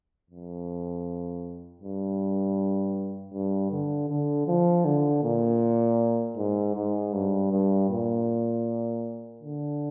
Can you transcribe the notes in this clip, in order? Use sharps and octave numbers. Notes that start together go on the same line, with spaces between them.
F2
G2
G2
D3
D3
F3
D3
A#2
G#2
G#2
G2
G2
A#2
D3